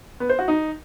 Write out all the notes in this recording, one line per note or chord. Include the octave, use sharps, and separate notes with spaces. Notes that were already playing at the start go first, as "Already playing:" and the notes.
B3
C5
F#4
D#4